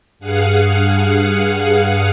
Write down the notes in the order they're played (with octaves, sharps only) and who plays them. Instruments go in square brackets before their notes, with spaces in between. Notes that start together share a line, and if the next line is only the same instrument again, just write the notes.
[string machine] G2 G#4 F5 F#5